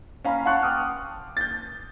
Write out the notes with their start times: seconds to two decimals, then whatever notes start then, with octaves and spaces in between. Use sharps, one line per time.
0.25 C#4 F5 A#5 B5
0.46 F5 F#5 A5 C6 C#6 F#6
0.62 G5 A5 D6 D#6 F6
1.37 G6 A6